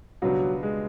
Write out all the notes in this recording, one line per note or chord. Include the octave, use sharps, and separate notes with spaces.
C#2 B2 F#3 G3 B3 D4
G#3